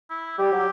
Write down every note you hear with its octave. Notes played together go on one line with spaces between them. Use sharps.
E4
G3 G4
F#3